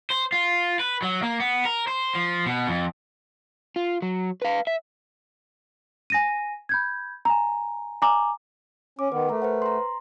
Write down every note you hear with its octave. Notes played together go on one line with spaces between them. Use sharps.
C5
F4
B4
F#3
A#3
B3
A#4
C5
F3
B2
F2
F4
F#3
B4 F5
E5
G#5 A#6 D#7
B5 G6 G#6
G#5 A#5
G#5 A#5 D6
C#4 D6
D#3 B3 B4
A3 A#4 A#5
B4 C5 F#5
A#5 C6